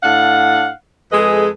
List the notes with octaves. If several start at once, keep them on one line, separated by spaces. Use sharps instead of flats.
A2 D4 F5 F#5
F2 G#3 G#4 A4 B4 D#5